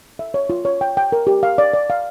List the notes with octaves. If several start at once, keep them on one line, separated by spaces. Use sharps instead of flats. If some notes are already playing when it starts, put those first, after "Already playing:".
E5
C#5
F4
C#5
G5
G5
A#4
G4
F5
D5
D5
F5